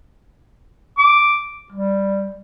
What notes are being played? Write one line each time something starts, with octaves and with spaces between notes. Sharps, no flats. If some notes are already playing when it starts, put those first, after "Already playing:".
D6
G3